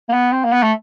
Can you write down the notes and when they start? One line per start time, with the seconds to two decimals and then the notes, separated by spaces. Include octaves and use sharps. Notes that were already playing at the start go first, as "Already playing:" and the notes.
0.09 A#3
0.13 B3
0.32 C4
0.44 A#3
0.52 B3
0.63 A3